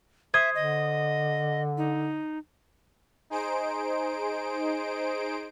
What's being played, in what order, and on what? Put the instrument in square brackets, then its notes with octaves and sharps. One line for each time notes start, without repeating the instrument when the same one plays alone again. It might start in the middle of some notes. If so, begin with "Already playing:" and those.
[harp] C5 D#6 G#6 [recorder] E5
[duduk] D3 [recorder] D#5
[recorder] D#4
[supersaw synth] D#4 G#4 C5 D7